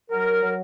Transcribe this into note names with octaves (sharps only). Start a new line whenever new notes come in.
F#3 A#4
F#3